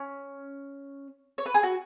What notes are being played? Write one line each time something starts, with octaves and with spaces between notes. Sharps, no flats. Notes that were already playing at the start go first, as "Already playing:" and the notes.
Already playing: C#4
C#5
B4
G#4
F#4